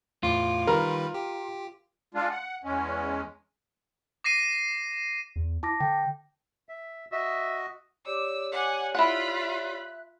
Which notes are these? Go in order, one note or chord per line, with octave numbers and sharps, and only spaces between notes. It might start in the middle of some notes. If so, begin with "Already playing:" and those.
E2 A2 F4 D6
D#3 G3 A#4 B4
G4
G#3 D4 F4
F#5
E2 G#3 C#4
D6 A#6 C7 D#7
E2
E4 A5 D6 A#6
D3 G5
E5
F#4 D#5 E5
G4 C#5 D5 D6 E6
F#5 G#5
E4 F4 E5 F#5 B5 F#6